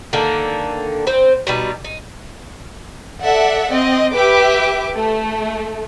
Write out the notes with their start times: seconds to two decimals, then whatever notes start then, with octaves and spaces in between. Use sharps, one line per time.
0.13 D3 D#3 A#3
1.07 C4 C5
1.47 B2 G3 D#4
1.84 D#4
3.23 A4 D5 E5 F#5
3.70 C4 D#5
4.13 G4 B4 E5 D6
4.95 A3